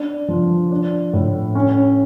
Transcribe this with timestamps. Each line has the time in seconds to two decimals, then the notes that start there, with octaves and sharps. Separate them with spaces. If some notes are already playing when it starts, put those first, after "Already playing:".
Already playing: D4
0.28 F3
0.72 D4
1.13 A2
1.55 C#4